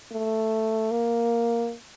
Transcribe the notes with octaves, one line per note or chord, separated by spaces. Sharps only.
A3
A#3